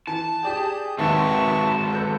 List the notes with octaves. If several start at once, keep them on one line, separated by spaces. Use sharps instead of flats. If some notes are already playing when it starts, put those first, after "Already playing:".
E3 A5
G4 G#4 D5 G5 D#6 G6
D#2 F#3 G#3 C4 B4 E5 A5 C#6
A4 B4 F#6 G6